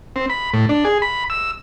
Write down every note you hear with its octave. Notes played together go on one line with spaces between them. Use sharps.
C4
B5
A2
D4
G#4
B5
E6